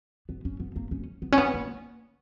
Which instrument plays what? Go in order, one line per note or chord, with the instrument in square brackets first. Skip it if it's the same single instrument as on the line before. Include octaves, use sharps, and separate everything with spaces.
[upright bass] B3
C#4
B3
A#3
C#4
B3
C#4
B3
A#3